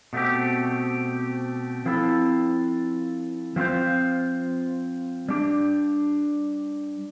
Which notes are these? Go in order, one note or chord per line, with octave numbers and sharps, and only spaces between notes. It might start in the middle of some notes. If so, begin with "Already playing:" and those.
B2 A3 C4 G4
F3 C4 E4 A4
F3 C4 F4 C5
G3 D4 G4